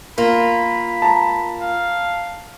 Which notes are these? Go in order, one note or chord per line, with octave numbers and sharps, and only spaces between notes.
A#3 F4 B5
A5 A#5
F5